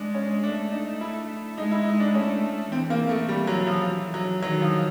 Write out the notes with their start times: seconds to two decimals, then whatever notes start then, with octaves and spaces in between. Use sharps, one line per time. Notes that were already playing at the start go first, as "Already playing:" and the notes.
Already playing: G#3 D4
0.15 C#4
0.43 A3 D4
0.72 D#4
1.01 E4
1.57 G#3 D#4
1.71 E4
1.85 D#4
2.00 D4
2.14 A3 C#4
2.71 E3 C4
2.90 A#3
3.09 A3
3.29 G3
3.47 F#3
3.67 F3
4.14 F#3
4.42 D#3 F#3
4.62 F3